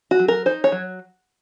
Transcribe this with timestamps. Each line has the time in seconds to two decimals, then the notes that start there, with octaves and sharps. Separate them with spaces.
0.11 F#4
0.19 F#3
0.28 A#4
0.46 D#4 C5
0.64 C#5
0.72 F#3